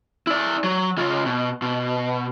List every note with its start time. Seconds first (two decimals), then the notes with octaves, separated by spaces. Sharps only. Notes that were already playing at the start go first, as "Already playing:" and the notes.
0.27 E4 D5
0.64 F#3
0.98 C#3 F4
1.26 B2
1.62 B2